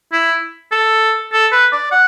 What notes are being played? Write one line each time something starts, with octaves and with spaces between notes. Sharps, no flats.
E4
A4
A4
B4
D5
F#5